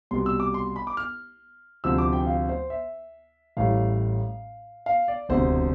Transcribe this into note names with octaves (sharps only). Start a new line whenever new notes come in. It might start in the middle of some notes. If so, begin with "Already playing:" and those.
C2 B2 G3 C6
E6
D6
C6
B5
D6
F6
D2 C3 F3 E6
D6
G5
F5
C5
E5
A1 A2 G3 F5
F5
D5
E1 D2 C3 C5